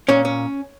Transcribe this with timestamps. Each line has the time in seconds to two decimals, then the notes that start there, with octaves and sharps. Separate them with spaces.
0.09 A#2 C#4 C#5
0.25 C#4